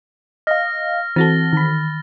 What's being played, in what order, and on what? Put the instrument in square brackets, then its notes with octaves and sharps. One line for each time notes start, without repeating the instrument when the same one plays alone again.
[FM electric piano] D#5 F5 [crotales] F6 A#6
[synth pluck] E3 [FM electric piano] C4 F#4 A4 [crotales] A6 A#6 G7
[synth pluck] D#3 B5